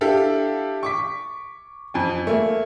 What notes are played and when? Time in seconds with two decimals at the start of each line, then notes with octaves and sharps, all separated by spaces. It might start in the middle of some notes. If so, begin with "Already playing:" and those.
0.01 D4 E4 G4 A4 F5
0.83 C#6 D6 B6
1.94 F2 G#5
2.27 A3 A#3